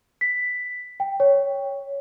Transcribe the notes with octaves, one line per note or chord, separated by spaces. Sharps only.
B6
G5
C#5